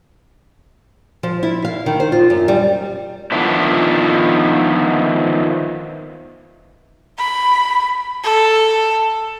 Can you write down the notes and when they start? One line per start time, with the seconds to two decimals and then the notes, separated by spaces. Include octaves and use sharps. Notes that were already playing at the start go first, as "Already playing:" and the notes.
1.23 F3
1.43 E4
1.65 F5
1.86 D#3
2.00 C5
2.12 F4
2.30 F#2
2.48 G3
3.32 D#3 F3 B3 D4 E4
7.18 B5
8.23 A4